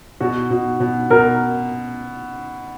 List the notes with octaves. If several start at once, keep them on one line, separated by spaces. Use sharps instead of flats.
B2 F#4
B2
B2
B2 A#4